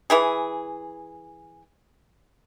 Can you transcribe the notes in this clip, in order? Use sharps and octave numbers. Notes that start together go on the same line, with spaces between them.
E3 E4 G#4